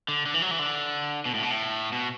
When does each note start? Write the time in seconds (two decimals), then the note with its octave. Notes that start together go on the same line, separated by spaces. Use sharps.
0.08 D3
0.26 D3
0.34 E3
0.42 F#3
0.51 E3
0.59 D3
1.26 B2
1.34 A2
1.43 B2
1.50 A2
1.92 B2